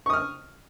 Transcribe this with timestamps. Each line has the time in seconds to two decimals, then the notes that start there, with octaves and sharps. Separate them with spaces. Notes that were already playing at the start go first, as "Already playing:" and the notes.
0.06 C#6
0.10 D#6
0.13 F6